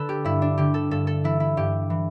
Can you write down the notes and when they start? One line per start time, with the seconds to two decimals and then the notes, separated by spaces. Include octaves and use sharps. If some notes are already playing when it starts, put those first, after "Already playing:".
Already playing: D3 A4 B4
0.09 G4
0.24 G2 E4
0.42 D4
0.58 D3 G4
0.74 A4
0.91 G2 A4
1.07 A4
1.24 E3 E4
1.40 E4
1.57 G2 G4
1.90 E3